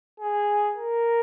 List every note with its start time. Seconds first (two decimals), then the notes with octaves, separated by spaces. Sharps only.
0.20 G#4
0.76 A#4